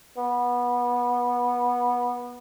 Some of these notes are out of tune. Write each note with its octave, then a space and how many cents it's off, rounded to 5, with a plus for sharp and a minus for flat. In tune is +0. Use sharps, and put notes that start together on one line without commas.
B3 -20